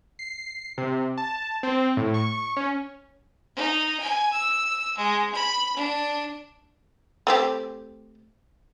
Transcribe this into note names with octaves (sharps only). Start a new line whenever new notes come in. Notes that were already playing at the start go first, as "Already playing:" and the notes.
C7
C3
A5
C4
A2
C#6
C#4
D#4
G#5
E6
G#3
B5
D4
A3 C4 G4